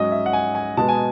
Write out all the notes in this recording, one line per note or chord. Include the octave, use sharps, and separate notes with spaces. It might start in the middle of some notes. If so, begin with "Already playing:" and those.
Already playing: G#2 F#3 C#4 D#5
E5
F#5
G#5
G#5
B2 G#3 B3 A5
G#5